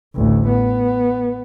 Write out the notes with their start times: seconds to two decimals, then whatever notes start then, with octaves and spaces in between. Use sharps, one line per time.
0.15 A1 D2
0.48 B3